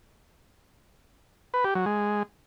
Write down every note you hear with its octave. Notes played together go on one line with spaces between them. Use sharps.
B4
G4
F#3
G#3